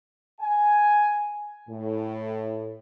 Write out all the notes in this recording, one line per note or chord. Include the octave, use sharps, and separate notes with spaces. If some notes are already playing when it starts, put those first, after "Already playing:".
G#5
A2